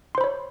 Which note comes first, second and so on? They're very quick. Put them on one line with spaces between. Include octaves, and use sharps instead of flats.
C6 C5 B5 C#5